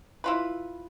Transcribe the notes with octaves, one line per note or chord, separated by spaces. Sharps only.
E4 F4 B4